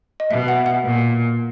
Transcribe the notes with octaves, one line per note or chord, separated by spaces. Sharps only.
D#5
B2 E5
F#5
F#5
A#2